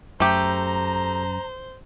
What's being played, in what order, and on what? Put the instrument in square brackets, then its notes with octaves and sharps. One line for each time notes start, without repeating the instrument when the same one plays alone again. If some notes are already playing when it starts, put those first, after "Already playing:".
[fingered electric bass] F#2 [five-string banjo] A3 G4 [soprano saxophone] C5 [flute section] A#5